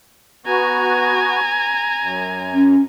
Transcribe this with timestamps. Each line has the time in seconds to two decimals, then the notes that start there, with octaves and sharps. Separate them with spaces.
0.46 B3 F#4 G#5 A#5
2.01 F#2
2.54 C#4